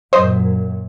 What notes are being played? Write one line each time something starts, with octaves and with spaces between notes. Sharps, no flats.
F#2 A#2 C5 D#5